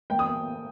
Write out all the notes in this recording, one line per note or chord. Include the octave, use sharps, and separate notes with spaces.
A#3 G5
D#6